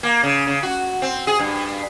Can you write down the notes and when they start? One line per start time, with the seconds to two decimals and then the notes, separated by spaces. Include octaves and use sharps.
0.03 A#3
0.23 C#3
0.47 C#3
0.63 F#4
1.02 C4
1.27 G#4
1.39 G2